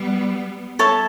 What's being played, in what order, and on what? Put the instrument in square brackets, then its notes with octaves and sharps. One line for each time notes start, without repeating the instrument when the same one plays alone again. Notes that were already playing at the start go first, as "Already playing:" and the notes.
Already playing: [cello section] G3 B3
[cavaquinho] A4 C#5 E5 A5